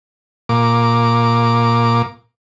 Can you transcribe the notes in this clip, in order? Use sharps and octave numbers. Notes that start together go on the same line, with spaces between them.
A#2 D6